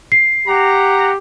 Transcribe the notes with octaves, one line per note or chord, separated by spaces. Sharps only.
C7
G4 F#5 A#5